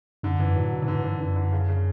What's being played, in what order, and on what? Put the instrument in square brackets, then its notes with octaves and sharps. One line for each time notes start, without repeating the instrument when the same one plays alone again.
[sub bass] F#2 [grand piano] D3
[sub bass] F#2 [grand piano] E3
[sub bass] A2 [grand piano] F#3
[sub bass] B2
[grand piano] E3
[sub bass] G2 [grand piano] D3
[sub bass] A2
[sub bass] G2 [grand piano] E3
[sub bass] F#2 [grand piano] D3
[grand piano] D3
C#3
C#3